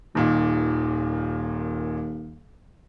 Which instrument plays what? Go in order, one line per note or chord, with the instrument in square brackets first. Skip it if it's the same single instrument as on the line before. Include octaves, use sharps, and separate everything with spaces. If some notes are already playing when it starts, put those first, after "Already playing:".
[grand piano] D#1 A#2 D#3 [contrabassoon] D#2